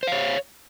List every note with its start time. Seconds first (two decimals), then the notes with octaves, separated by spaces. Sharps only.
0.03 C5
0.07 F5
0.12 C#5